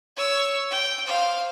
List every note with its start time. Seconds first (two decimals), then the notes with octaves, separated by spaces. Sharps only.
0.16 C#5 E6
0.70 G5
1.06 C5 F5